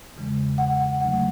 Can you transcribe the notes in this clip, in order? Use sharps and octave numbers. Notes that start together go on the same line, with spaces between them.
E2 C#3 E3 G#3
F#5
F#5
D2 D3 F#3 A3 F#5